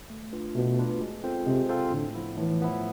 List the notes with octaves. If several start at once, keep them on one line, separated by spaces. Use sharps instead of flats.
A3
D4 F4 B4
B2 A3
D4 F4 B4
G#3
C4 F4 A4 C5
C3 G#3
C4 F4 A4 C5
A2 D3
F3 B3 E4
A2 E3
F3 B3 E4